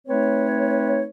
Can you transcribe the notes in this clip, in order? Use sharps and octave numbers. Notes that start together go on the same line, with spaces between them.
A3 C4 D#4 B4 C#5